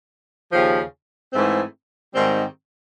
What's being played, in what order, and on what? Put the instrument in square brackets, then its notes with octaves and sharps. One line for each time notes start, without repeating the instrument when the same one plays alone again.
[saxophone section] D#2 C#3 F3
G#2 E3 A3 C4
G#2 D#3 G3 C4